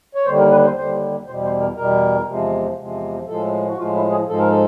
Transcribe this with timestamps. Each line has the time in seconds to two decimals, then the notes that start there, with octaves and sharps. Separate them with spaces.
0.15 C#5
0.26 D#2 D3 G3 C5
0.39 A#4
0.51 B4
0.64 C5
0.76 D#2 D3 G3 C5
1.26 E2 B2 G3 C5
1.44 C5
1.60 A#4
1.76 E2 B2 G3 A#4
2.27 E2 C3 F3 G#3
2.77 E2 C3 F3 G#3
3.27 A2 F3 G#3 A4
3.68 F#4
3.78 A2 F3 G#3 F4
3.95 E4
4.11 G#4
4.28 G#2 F3 G#3 A4
4.38 A#4
4.49 A4